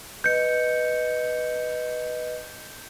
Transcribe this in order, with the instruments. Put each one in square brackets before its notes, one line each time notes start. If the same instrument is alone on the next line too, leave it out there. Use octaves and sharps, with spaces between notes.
[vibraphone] B4 D#5 [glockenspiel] G6 C#7